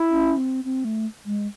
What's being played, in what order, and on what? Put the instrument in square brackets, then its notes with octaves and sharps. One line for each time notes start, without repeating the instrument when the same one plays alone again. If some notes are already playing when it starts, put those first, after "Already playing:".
Already playing: [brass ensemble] E4
[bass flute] C#4
C4
C4
A3
G#3